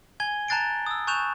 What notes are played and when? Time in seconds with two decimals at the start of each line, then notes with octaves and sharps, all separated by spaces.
0.20 G#5 G#6 G7
0.48 A5 A#5 F#6 A6 C7 D7
0.86 D#6 E6
1.07 G#5 C#6 F#6 G6 E7 F7